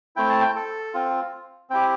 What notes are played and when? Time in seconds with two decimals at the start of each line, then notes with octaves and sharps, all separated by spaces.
0.16 A3 C4 E4 G5
0.29 A5
0.41 G5
0.56 A4
0.94 C4 F4
1.70 C4 E4 G4 G5